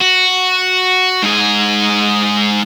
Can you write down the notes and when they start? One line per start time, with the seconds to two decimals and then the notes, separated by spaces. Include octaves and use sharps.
0.01 F#4
1.22 G#2 G#4